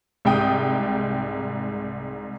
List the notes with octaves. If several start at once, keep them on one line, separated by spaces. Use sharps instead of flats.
C2 G#2 G5 D#6